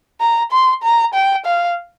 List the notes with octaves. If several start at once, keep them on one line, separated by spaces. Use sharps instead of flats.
A#5
C6
A#5
G5
F5